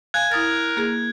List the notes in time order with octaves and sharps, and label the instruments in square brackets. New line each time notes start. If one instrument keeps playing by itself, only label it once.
[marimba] F5 G#5 [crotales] F#6 G#6
[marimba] E4 D#6 A6 [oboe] A#4
[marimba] A#3 G#4